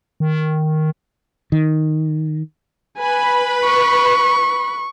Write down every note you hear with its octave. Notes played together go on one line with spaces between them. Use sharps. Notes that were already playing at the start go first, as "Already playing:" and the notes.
D#3
D#3
B4 G#5 B5
C#6